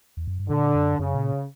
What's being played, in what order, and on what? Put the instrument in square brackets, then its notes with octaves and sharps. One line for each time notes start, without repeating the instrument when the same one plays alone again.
[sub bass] E2
F#2
G2
[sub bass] A#2 [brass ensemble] D3
[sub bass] F#2
[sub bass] F#2 [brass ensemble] C#3
[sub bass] A#2